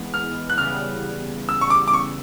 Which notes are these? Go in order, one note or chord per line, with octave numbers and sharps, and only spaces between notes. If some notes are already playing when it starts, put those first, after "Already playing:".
Already playing: E3 G#3 B3
F6
F#6
C#3 E3 G3 B3 F6
E6
C#6
D6
D6
C#6